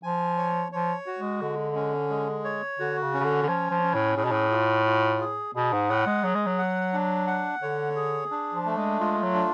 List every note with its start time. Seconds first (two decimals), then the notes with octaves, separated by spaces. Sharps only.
0.03 F3 G#5
0.37 C#5
0.72 F3 C#5
1.06 F#4
1.18 G#3
1.41 D3 G#3
1.76 C#4
2.09 G#3
2.45 C#5
2.79 D3 F#4
3.02 C#3
3.14 C#4
3.20 C#3
3.25 D3
3.42 D3
3.47 F3 C#5
3.71 F3
3.83 C#4
3.94 A2
4.16 A2 G#4
4.24 B2
4.32 A2
4.51 F4
4.86 F4
5.21 G#4
5.55 B2 G#4
5.73 G#2
5.89 A2 F#5
6.07 G#3
6.24 F#3 G#4
6.35 G#3
6.46 F#3
6.58 F#5
6.93 D4
7.27 F#5
7.61 D3 C#5
7.96 G#4
8.31 D4
8.53 F3
8.66 A3
8.77 G#3
9.00 G#3 F4
9.23 F#3
9.34 D4